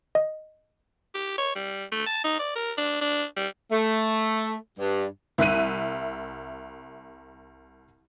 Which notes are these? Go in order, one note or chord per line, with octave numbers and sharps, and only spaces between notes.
D#5
G4
C#5
G3
A3
A5
D#4
D5
A#4
D4
D4
G3
A3
G2
C2 E5 F#6 D#7